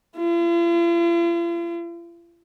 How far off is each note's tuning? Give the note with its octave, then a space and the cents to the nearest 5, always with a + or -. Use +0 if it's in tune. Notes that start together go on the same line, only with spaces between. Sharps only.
F4 -45